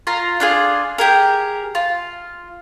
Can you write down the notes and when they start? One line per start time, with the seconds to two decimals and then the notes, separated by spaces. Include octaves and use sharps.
0.07 F4 F5 A#5
0.40 D4 F4 G#4
0.98 G4 G#4 A#4
1.75 F4